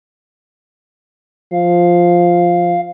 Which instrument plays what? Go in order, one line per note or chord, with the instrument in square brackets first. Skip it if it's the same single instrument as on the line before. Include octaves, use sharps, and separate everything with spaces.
[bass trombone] F3 [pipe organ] F5